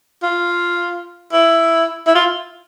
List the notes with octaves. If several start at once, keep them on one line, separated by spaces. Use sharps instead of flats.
F4
E4
E4
F4